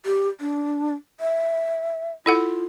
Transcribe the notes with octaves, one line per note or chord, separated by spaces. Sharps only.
G4
D4
E5
E4 F4 A4 F#5